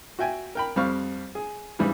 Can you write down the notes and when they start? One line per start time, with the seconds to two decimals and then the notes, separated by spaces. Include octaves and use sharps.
0.19 F#4 E5 G5 G#5
0.55 A#4 G5 B5
0.76 F2 G3 C4 F5 C#6
1.35 G#4
1.79 G#2 C#3 E3 G3